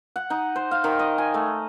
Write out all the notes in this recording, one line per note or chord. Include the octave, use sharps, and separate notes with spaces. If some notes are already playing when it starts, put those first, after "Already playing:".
F#5
D#4
C5
F5
D#3
D#5
G#5
A3